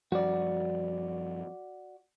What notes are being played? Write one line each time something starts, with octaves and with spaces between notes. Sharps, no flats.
F#2 F3 G3 F#4 D5